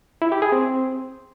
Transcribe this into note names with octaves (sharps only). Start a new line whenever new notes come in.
E4
G4
G#4
C4